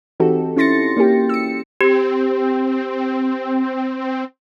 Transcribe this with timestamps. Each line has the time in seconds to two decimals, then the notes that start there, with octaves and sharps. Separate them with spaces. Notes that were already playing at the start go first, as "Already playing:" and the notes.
0.20 E3 C4 D#4 F#4 G4 A4
0.57 C#4 E4 C6 A6 A#6 C#7
0.97 A#3 C#4 E4 G4 G5
1.29 E6 C#7
1.81 C4 G4